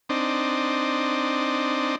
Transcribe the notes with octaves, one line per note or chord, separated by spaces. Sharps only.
C4 D4 D#4